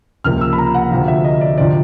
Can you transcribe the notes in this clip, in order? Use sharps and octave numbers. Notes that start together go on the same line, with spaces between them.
C#2 C3 F3 A#3 F6
E6
B5
A#5
F#5
D2 C3 F3 F5
E5
D#5
D5
D2 C3 F3 D5